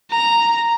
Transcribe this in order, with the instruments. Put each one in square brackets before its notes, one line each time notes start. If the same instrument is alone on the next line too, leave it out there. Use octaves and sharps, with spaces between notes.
[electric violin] A#5